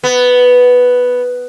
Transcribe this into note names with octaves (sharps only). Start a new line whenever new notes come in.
B3